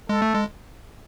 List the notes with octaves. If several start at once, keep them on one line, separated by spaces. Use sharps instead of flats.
G#3 A4
A3
G#3